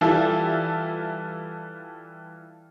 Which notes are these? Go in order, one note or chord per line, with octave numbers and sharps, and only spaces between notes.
E3 G3 F4 A4 E5